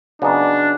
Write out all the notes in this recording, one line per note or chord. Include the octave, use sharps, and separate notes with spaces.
C#3 F#3 B3 D4 D#4